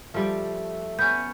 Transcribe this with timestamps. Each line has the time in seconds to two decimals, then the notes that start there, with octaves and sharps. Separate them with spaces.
0.14 F3 G3 A3 D5
0.99 B3 C#4 G6